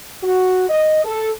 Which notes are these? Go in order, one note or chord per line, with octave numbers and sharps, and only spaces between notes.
F#4
D#5
A4